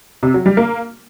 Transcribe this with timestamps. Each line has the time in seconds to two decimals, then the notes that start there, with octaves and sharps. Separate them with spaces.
0.23 C3
0.34 F#3
0.46 G3
0.57 A#3